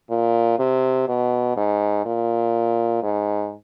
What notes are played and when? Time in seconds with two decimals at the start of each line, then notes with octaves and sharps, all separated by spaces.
0.10 A#2
0.59 C3
1.08 B2
1.57 G#2
2.05 A#2
3.03 G#2